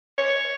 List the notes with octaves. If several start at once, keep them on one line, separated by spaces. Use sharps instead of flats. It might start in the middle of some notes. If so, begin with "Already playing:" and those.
C#5